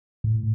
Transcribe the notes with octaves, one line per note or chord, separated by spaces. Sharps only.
A2